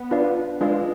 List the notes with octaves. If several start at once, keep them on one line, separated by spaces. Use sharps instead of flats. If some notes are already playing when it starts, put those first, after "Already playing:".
Already playing: B3
D4 F4 B4 D5 F5
G#3 D4 F4 B4 D5 F5